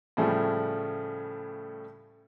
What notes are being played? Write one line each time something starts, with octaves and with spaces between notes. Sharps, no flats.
A2 C#3 F3 G3 A3 G#4